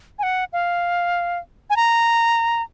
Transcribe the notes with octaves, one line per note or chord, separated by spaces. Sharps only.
G#5
F#5
F5
G#5
A#5